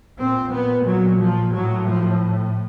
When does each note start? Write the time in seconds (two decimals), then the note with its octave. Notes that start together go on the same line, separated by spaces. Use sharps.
0.20 A#2 C4
0.53 B3
0.87 F#3
1.20 F3
1.53 A2 F#3
1.87 F3